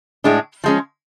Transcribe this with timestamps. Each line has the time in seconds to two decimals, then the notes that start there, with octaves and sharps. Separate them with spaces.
0.24 A2 G#3 D4
0.64 F3 G#3 C#4